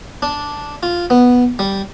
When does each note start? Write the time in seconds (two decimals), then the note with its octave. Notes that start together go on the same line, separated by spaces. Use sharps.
0.22 D4
0.83 F4
1.10 B3
1.59 G3